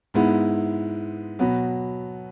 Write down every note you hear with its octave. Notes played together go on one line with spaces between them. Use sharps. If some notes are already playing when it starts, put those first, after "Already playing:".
G#2 G#3 B3 E4
B2 F#3 B3